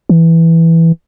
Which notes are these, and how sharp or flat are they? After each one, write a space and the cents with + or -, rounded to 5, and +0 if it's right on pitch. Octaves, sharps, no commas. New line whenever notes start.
E3 +0